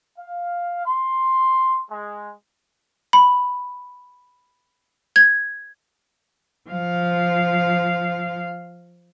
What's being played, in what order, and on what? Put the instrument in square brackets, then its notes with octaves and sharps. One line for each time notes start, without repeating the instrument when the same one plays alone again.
[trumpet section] F5
C6
G#3
[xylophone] B5
G#6
[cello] F3 F5